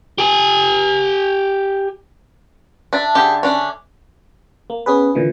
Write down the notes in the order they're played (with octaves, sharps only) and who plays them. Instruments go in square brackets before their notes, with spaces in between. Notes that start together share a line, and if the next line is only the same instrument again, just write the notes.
[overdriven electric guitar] G4 G#5
[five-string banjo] D4 [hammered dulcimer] E5 A5
[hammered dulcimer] D3 [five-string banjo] G4 G#4
[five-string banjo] C#4 D4
[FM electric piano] A#3
B3 C#4 G#4 B4
A#2 D3 E3